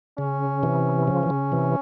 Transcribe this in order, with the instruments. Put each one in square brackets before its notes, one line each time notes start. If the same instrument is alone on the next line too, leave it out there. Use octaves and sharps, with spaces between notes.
[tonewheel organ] C#3 [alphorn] C#4
[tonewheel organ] C3 E3
C#3 F3
E3
C#3
C3 E3